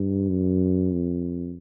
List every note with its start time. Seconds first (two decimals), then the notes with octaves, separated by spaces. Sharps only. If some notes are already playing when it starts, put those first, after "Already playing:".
Already playing: G2
0.29 F#2
0.92 F2